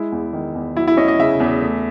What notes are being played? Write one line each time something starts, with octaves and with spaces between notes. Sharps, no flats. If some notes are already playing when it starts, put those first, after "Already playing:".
Already playing: G#3 E4
E2
D#3
E2
F#3 E4
E4
C#4 D#5
D#5
C#3 E5
E2
A3